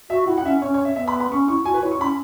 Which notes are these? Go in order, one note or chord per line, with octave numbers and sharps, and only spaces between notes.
F#4 E5
E4 F#5
F#5
C#4 E5
C#4 C#5
C#5
E5
B3 E5
B5
B5
C#4 C#6
E4 C#6
F#4 G#5
B4
E4 C#5
C#6
C#4 B5